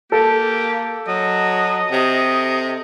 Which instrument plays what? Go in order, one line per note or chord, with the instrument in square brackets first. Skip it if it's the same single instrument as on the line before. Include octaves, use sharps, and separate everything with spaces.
[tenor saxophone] A#3 [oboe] G4 [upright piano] A4
[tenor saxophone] F#3 [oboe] D#5
[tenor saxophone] C3